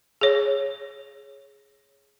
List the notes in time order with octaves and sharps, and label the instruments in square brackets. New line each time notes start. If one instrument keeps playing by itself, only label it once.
[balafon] G#4 C#5